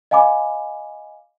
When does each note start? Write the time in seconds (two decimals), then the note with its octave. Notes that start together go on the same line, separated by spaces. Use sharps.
0.11 D#5 F5 G#5 B5 D6